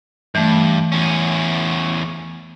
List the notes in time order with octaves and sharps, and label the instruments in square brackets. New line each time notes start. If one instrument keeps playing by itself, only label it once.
[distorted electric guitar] G2 [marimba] E3 A3
[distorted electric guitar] E2 C#4